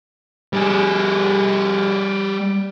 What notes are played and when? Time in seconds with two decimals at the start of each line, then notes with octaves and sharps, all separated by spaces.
0.53 G3 G#4